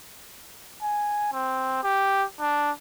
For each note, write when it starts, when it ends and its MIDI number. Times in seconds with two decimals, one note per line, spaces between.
0.82 1.32 80
1.33 1.80 60
1.84 2.25 67
2.40 2.71 62